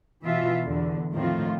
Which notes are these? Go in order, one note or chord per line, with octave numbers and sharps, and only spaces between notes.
B2 E3 F4 E5
E2 D3
A2 D#3 F3 C4 F4